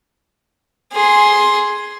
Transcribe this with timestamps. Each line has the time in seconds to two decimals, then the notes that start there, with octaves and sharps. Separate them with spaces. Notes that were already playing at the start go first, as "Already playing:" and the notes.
0.93 G#4 C6